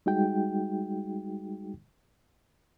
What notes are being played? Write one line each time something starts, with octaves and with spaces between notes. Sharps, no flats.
G3 G#3 D#4 F#4 G#4 G5